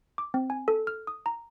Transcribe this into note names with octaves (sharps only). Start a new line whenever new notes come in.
D6
C4
G#5
A4
F6
D#6
A#5